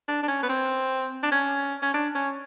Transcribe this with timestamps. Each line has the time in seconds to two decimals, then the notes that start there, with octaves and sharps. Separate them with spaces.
0.08 D4
0.23 D4
0.28 C#4
0.43 B3
0.49 C4
1.23 D4
1.32 C#4
1.82 C#4
1.94 D4
2.15 C#4